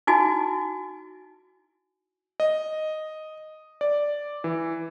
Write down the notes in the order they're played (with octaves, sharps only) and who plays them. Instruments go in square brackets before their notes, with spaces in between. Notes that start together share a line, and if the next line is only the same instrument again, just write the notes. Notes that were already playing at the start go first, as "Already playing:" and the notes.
[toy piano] D#4 E4 F#4 G#5
[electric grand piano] D#5
D5
E3